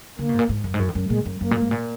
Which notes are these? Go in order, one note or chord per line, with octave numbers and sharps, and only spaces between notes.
D3 A#3
B2
G#2
A#2
G#2
F#2
G#2
F#2
F2
F#2
A#2 G#3
F#2
F#2 A#3
A#2
G#2
A#2